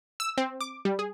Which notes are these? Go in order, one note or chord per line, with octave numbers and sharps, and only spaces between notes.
E6
C4
D6
G3
G#4